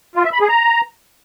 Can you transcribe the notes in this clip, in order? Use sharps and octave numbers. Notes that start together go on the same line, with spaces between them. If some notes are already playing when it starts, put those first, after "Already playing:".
F4
E5
B5
G#4
A#5